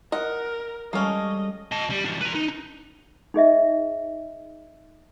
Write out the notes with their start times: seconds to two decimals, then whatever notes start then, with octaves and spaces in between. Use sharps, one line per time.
0.12 A#4 D#5 F#5
0.93 G3 G#3 A#3 C#4 A4 D#5
1.72 D#5 A5
1.90 G3
2.05 E3 D4
2.21 B4 A#5
2.35 D#4
3.34 D#4 G#4 D#5 E5